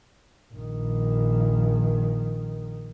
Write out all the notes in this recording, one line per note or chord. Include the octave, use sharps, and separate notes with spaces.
A#1 D#3